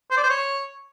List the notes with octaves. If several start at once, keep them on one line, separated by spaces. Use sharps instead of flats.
C5
D5
C5
C#5